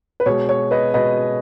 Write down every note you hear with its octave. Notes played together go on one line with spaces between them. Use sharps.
B4
B2 G#3 C#5
C#5
B4 D#5
B2 G#3 B4 D#5